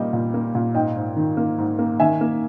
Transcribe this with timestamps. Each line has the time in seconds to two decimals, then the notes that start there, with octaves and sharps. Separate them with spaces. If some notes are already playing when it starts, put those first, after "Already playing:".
Already playing: A#2 G3 A#3 D#5 G5
0.13 A#2
0.34 A#3
0.55 A#2
0.74 G#2 D#5 G5
0.97 G#2
1.17 D#3
1.37 A#3
1.58 G#2
1.79 A#3
2.00 D#3 E5 G#5
2.21 A#3